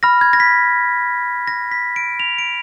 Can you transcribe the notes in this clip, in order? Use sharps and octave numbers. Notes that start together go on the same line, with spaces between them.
B5 F6 A#6
G#6
A#6
B6
A#6
B6
D7
F7
D7